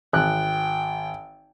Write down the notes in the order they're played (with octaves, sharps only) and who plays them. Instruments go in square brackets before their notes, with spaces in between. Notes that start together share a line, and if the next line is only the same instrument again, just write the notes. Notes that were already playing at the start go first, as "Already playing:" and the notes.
[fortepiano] G#1 F#6 [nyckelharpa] G5